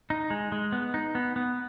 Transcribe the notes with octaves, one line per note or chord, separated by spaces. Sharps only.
D#4
G#3
G#3
B3
D#4
B3
B3